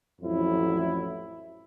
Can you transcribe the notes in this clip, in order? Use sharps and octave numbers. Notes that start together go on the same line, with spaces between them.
A1 F2 F#3 E4